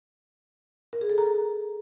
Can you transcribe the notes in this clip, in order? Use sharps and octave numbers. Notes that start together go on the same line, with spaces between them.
A#4
G#4
A4
A#5